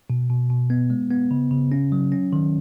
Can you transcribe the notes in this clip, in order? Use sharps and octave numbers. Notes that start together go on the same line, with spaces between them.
B2
B2
B2
B3
G#3
B3
C#3
C#3
C#4
F#3
C#4
D#3